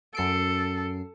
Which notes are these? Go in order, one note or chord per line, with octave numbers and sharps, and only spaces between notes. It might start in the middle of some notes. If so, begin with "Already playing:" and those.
F#2 A4 C7 D7